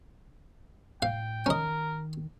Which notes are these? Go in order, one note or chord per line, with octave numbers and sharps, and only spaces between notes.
A2 F5 G5
D#3 C#4 A#4 D#5